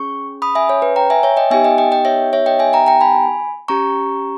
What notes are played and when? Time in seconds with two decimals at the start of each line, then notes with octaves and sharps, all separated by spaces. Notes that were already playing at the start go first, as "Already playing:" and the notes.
Already playing: C#4 G#4 C#6
0.42 B5 D#6
0.55 E5 G#5
0.69 C#5
0.82 B4
0.96 G5 A#5
1.10 E5 G#5
1.23 C#5 E5
1.37 D#5 G5
1.51 B3 D#4 G4 E5 G#5
1.64 D#5 G5
1.78 D#5 G5
1.92 D#5 G5
2.05 C#5 E5
2.33 C#5 E5
2.46 D#5 G5
2.59 E5 G#5
2.73 G5 A#5
2.87 G5 A#5
3.01 G#5 B5
3.68 C#4 G4 A#5 C#6